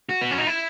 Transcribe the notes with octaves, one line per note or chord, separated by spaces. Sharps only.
F#4
B3
C#4
D#4
E4